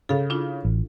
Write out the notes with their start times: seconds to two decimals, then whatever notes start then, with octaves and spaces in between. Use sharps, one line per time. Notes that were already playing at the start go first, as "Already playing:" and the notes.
0.09 C#3 A4 F5
0.30 D4 E4 F4
0.65 A1